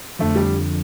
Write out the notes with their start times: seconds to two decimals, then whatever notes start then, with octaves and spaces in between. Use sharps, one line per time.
0.19 F2 D3 F3 A3
0.36 G3